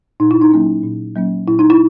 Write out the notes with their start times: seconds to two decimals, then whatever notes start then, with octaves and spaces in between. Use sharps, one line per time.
0.20 A#2 D#4
0.31 E4
0.41 D#4
0.51 F#3 A#3 C#4
0.83 A#2
1.15 F#3 A#3 C#4
1.47 A#2 E4
1.59 D#4
1.70 E4